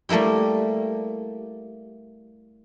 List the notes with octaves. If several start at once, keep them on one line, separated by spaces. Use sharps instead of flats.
G3 A3 A#3 E4 G4